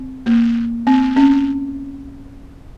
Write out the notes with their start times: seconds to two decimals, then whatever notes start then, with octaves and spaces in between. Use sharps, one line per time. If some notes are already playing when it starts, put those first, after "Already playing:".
Already playing: C4
0.26 A#3
0.87 C4
1.16 C#4